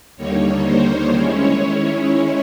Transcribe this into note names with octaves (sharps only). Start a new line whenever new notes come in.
D#2 D3 G3 A#3 D#4 C#5
C5
D#3 G#3 C#4 E4 C#5